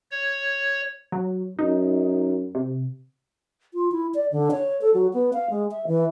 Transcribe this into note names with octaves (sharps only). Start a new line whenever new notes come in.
C#5
F#3
F#2 D#4
C3
F4
E4
D5
D3
C#5
A4
F#3
B3
F5
G#3
E5
E3